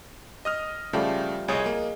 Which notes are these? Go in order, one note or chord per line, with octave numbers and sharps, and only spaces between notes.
D#5 D#6 F6
C#3 F3 G3 A3
C2 G#4 C#5 D#5 D#6
A#3